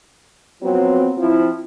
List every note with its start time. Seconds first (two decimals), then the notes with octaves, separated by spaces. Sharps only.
0.62 F3 F#3 B3 C4
1.17 F3 C4 E4